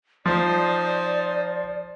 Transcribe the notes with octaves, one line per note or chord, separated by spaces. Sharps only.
F3 D#4 C5 D5